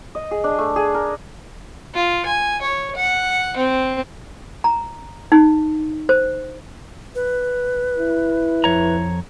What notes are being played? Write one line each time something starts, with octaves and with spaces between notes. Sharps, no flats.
D#5
G#4
D4
A3
G#4
A#4
F4
G#5
C#5
F#5
C4
A#5
D#4
C5
B4
E4
F2 C#5 A#5